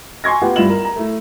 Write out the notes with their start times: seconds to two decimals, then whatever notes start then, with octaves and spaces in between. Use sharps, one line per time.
0.24 G#5 C6 C#6 G#6 A#6
0.42 B3 F4 G4 B4 F#5
0.56 G2 E4 F4 B5 E7 F#7
0.70 A#4
0.85 A#5
0.96 A3 E4